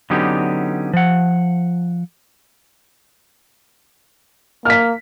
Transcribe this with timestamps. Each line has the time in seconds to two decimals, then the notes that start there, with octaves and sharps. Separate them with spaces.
0.10 D3 F#3 B3 C#4 D#4 G4
0.93 F3 F#5
4.65 A#3 F6 B6